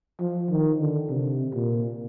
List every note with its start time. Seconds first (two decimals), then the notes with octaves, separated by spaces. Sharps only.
0.20 F3
0.50 D#3
0.79 D3
1.09 C3
1.54 A#2